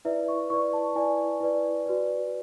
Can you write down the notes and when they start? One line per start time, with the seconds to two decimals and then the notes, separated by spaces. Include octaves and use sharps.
0.05 E4 B4 D5 E5
0.28 C#6
0.50 E4 B4 D5 C#6
0.73 A5
0.96 E4 B4 D5 G#5
1.40 E4 B4 D5
1.86 F#4 B4 D5